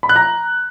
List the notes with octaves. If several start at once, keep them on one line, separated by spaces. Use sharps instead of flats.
B5
F#6
A#5